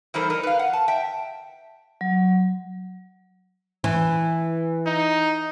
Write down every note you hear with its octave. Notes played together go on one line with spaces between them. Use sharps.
E3 G3 D#4 A4 A#4 C5
D#4 A4 A#4
B4 F5
F#5
A5
E5 G5
F#3
E3
D#4